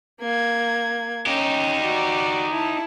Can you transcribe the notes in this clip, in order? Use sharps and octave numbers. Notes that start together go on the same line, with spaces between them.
A#3 G#6
C#4 D#4 G4
F#4 D5
E4 A5